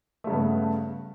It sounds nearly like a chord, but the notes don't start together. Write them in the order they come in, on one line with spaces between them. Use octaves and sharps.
A3 C#3 G2 B3